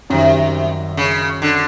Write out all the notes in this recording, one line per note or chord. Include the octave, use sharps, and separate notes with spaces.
F#2 C3 D#3 G3
C#3
D3